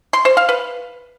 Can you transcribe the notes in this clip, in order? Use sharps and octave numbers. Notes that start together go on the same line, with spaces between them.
C6
C5
F5
B4